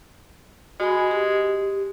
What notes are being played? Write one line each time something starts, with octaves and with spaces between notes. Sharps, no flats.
G#3 F#4 G#5 B5
G4